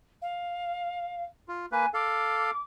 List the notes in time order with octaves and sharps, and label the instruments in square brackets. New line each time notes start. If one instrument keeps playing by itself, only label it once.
[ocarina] F5
[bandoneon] F4
[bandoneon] A#3 B4 [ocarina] G#5
[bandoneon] A4 F5 [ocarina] D6